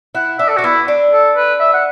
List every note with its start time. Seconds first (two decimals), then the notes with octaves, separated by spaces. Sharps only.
0.15 E4 F#5
0.39 D4 E5
0.48 A4
0.57 D4 F#4
0.64 B3 E4
0.88 D4
1.13 A4
1.37 B4
1.60 E5
1.74 F#5